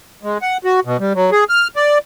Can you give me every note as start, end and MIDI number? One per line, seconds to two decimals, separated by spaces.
0.23 0.38 56
0.42 0.57 78
0.64 0.80 66
0.85 0.97 47
0.99 1.13 55
1.15 1.30 54
1.32 1.44 68
1.49 1.68 89
1.76 1.98 74